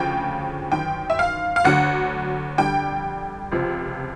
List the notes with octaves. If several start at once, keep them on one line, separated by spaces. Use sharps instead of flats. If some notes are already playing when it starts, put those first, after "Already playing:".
Already playing: D2 C#3 F3 G5
G1 F#2 D#3 G5
E5
F5
F5
D2 D3 F#3 F#5
F2 D3 G3 G5
C#2 C3 F3